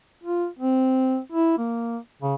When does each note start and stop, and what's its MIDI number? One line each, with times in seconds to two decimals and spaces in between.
0.24 0.46 65
0.59 1.19 60
1.32 1.57 64
1.58 1.98 58
2.22 2.35 49